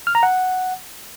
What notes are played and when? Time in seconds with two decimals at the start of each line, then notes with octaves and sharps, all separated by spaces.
0.07 F6
0.15 A#5
0.23 F#5